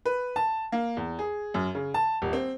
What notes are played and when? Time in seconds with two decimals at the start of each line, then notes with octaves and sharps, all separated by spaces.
0.05 B4
0.36 A5
0.72 A#3
0.97 E2
1.19 G#4
1.54 F#2
1.75 C#3
1.94 A5
2.22 D#1
2.33 C4